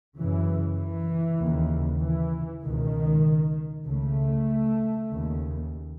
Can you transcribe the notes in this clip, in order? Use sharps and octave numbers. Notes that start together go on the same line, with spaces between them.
F#2 C#3 E3
E3
D#2 C#3
E3
C#2 B2 D#3
C#2 C#3 A3
D#2 C#3